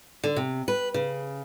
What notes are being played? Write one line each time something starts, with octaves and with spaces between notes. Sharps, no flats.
D3
C3
B4
C#3